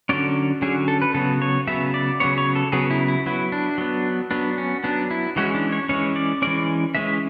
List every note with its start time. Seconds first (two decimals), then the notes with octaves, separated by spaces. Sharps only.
0.09 D3 F#3 C#4 D5
0.62 D3 F#3 C#4 G#4
0.88 A4
1.02 B4
1.14 C#3 F#3 B3 A4
1.42 C#5
1.67 C#3 F#3 B3 E5
1.94 D5
2.20 C#3 F#3 B3 C#5
2.38 C#5
2.55 A4
2.72 C#3 F#3 B3 G#4
2.90 E4
3.08 E4
3.26 F#3 B3 E4
3.52 D4
3.78 F#3 B3
4.31 F#3 B3 D4
4.58 C#4
4.84 F#3 B3 D4
5.11 E4
5.36 E3 G#3 C#4 F#4
5.55 D4
5.72 C#5
5.89 E3 G#3 C#4 C#5
6.16 D5
6.42 E3 G#3 C#4 D5
6.95 E3 G#3 C#4 E5